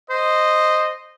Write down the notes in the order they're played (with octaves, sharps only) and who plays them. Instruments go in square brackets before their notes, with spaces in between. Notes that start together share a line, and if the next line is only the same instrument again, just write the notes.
[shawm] C5 [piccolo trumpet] D#5